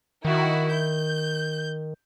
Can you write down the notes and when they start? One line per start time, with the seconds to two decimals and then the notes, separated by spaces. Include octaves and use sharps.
0.25 D#3 E4 F#4
0.71 G6